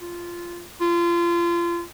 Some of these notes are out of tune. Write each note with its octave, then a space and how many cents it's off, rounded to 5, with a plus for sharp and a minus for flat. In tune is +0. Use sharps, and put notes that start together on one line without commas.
F4 -10
F4 -30